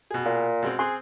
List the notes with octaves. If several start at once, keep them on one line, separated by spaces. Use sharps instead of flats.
B2 G#4
A#2
B2 G#3 C4
C4 G#4 C6 F#6